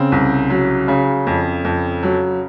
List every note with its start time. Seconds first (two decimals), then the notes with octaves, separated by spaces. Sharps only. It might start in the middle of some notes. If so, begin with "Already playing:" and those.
Already playing: C#3 C4
0.12 C2
0.50 F#3
0.88 C#3
1.27 F2
1.64 F2
2.03 F#3